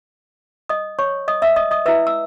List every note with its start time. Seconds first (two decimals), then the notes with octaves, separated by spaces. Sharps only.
0.69 D#5 D#6
0.99 C#5 C#6
1.28 D#5 D#6
1.42 E5 E6
1.56 D#5 D#6
1.71 D#5 D#6
1.86 E4 B4 E5 E6
2.07 E6